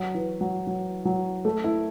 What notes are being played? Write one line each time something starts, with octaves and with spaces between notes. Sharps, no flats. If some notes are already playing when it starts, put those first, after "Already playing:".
Already playing: F#3
E3
F#3
F#3
F#3
A3
E4